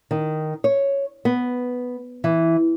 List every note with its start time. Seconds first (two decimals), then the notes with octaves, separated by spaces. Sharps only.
0.11 D#3
0.64 C#5
1.25 B3
2.24 E3